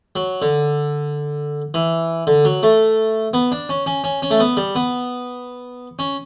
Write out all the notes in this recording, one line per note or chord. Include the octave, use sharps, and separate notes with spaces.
F#3
D3
E3
D3
F#3
A3
B3
D4
C#4
C#4
C#4
C#4
A3
B3
G3
B3
C#4